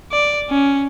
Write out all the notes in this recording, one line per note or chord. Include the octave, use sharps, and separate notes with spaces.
D5
C#4